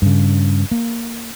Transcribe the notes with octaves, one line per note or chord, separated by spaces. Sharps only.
G2 C#3
A#3